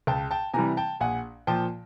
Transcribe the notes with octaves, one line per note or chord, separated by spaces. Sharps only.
C#2 G5 A5
G5 A5
C3 E3 G3 G#5 A#5
G5 A5
A#1 F#5 G#5
A#2 F3 G5 A5